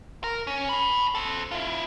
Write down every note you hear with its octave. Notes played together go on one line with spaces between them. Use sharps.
A#4
C#4
A5 B5
A4 C5
E4 F4